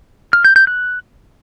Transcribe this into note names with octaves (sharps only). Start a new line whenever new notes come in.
F6
G6
G6
F#6